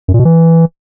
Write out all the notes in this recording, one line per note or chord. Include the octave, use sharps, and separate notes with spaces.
F#2
A#2
B2
E3